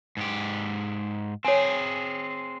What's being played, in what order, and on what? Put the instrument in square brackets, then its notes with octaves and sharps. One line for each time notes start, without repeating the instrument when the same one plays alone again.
[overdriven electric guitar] G#2 G4
[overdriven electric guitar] C4 G#4 [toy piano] C#5 G#5